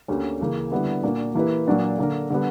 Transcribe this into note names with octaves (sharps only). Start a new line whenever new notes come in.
D2 D3 A#3 C#4 G4
C#2 C#3 E3 A#3
D3 G3 B3 E4
A#2 A#3 D4 F#4
E3 A#3 E4 G4 B4
A#2 F#3 A#3 D4 F#4
D3 A#3 D4 A#4
D3 G3 B3